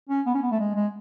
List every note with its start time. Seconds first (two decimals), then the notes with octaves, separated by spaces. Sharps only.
0.09 C#4
0.26 B3
0.35 C#4
0.43 B3
0.51 A3
0.59 G#3
0.75 G#3